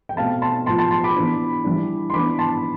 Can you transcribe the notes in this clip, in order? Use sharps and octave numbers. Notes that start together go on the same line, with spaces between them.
G5
B2 A3 C4 F5 A5
A5 C6
A2 F3 B3 A5 C6
A5 C6
A5 C6
B5 D6
E3 B3 D4
E3 G3 D4
C6
E3 B3 D4 B5 D6
A5 C6